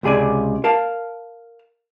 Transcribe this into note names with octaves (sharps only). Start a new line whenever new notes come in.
C#2 C3 G#4 D5 G#5
A#4 F5 A5